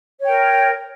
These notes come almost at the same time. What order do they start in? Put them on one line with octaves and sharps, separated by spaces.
C#5 G5 A#4